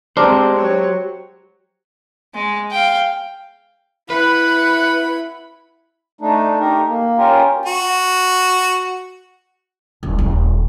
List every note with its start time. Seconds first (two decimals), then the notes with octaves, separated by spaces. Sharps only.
0.17 G#3 C4 D4 G4 A#4 C5
0.57 F#3 C#5
2.34 G#3
2.71 F5 G5
4.10 E4 B4 F#5 B5
6.21 A3 D4 D#4
6.60 A3 D#4 G4 A#4
6.88 A#3
7.17 C#4 F4 G4 A#4
7.66 F#4
10.03 D#1
10.19 D#1